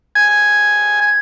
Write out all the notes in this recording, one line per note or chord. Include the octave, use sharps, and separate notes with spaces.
G#5